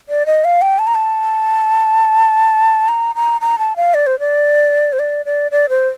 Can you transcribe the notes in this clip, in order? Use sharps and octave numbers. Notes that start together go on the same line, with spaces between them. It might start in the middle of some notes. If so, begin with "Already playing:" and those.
D5
D#5
F5
G5
A5
A#5
A5
A#5
A#5
A#5
A5
F5
D5
C5
D5
C5
D5
D5
D5
C5